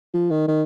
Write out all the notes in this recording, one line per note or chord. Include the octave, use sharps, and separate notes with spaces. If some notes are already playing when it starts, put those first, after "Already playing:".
F3
D#3
D#3